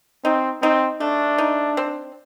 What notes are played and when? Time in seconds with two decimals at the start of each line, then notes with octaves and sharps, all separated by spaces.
0.24 C4 D#4
0.62 C4 D#4
1.00 A3 D4
1.38 D#4
1.77 C4